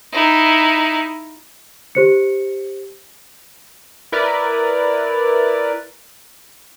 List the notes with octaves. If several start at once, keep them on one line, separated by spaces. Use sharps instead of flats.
D#4 E4
G4 C5 C#7
E4 A#4 B4 D5